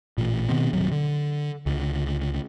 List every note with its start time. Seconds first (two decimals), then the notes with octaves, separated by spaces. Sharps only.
0.18 A1 A#2
0.48 B2 D#3 B3 C4
0.73 D#1 G#1 C3 F#3
0.92 D3
1.66 C#2 D3